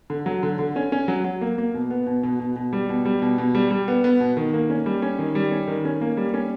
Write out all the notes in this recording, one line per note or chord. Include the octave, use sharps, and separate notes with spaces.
D3
F#3
D3
D3
C#4
C#4
F#3
F#3
A#3
A#3
B2
B3
B2
B2
B2
B2
G3
B2
G3
B2
B2
G3
G3
B3
B3
B2
D#3
A#3
C#4
G3
C#4
D#3
G3
C#4
D#3
C#4
A#3
G3
C#4